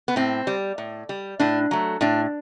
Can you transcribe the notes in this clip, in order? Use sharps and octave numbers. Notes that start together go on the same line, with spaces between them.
B3
A2 C4
G3
A2
G3
A2 D4
F#3 A3
A2 D4